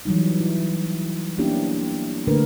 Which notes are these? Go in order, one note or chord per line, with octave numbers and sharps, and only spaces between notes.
E3 F#3 G3 D#4
E4
A#3 B3 C#4 D4 E4 G4
D3 A3 A#3 D4 A#4 B4